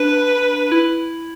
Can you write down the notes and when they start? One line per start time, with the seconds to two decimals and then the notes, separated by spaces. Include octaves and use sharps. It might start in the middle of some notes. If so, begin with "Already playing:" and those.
Already playing: D4 B4
0.72 E4